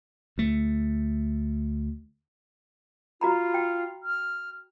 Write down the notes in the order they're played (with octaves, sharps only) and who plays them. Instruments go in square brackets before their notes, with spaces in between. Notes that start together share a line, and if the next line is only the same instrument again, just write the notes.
[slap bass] D2 A3
[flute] F4 [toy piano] F#4 A#5 B5
[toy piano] G5
[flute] F6